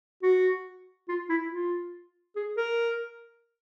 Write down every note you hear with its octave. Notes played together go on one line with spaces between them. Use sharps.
F#4
F4
E4
F4
G#4
A#4